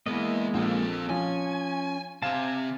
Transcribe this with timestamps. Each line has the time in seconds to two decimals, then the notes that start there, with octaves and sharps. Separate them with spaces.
0.06 G#3 A#3 B3 E4 D#5
0.54 A#1 C4 A4
1.09 F3 C#4 G#5
2.22 C3 C4 F5 G#5 A5 E7